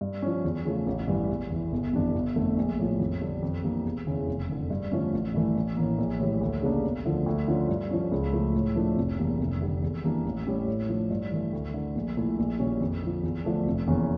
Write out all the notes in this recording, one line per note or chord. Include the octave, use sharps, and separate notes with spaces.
G2
F3 C#4
E2
C#3 F3 A3
A1
G2 E3 G3
E1
E2 E3
G1
F2 E3 G3 D4
G1
F2 D3 A3
A#1
A2 F3
F2
D3 G3 D4
F2
E3 G3 A#3 D4
E1
E2 C#3 E3
F1
F2 D3
G2
D3 F3 A3 C#4
A1
G2 E3 A3
A1
A2 E3 A#3
A#1
A2 E3 G3
D2
C#3 G3 A#3 D4
E1
D2 D3 F3
D2
D3 F3 C#4 F4
G2
F3 C#4
C#2
C#3 F3 A3
A2
F3 A3 D4
F1
E2 E3 G3 A#3
F1
F2 D3 G3
E2
E3 G3 A#3 D4
A1
A2 G3 C#4
A2
F3 A3 D4
G2
E3 A3
D2
D3 A3
A#1
A#2 A3 E4
A#1
A#2 G3 C#4
F2
D3 F3
E2
D3 F3 A3 D4
F1
E2 E3 A#3 C#4